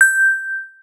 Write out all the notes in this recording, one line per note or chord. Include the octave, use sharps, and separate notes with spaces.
G6